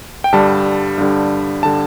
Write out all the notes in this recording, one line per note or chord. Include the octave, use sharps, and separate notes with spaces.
G5
G2 D3 G3 A5
G2 D3 G3
D3 G3 A5